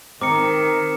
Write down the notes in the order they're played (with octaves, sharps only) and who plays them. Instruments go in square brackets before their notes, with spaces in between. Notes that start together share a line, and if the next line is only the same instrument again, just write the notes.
[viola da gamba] D#3 [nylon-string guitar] C4 [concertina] D#4 A#4 [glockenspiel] D6 C#7